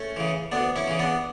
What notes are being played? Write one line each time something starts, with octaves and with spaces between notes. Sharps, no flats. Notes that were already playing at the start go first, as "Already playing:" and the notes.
Already playing: A3 C#4
C#3 E3
D2 B3 D4
C#4 E4
C#3 E3
B3 D4